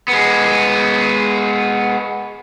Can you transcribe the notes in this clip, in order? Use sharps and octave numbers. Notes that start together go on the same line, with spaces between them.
G#3 B3